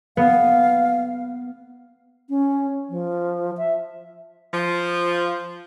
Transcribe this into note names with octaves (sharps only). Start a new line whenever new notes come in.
B3 F5
C#4
F3
E5
F3